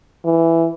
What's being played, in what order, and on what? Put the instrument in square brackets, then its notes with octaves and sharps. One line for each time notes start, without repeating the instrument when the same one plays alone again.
[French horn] E3